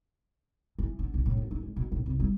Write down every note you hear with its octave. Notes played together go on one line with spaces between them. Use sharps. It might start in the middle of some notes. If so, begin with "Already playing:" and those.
E3
D3
B1
A2
F#2
D4
G#3
B2
A#1
C2
G3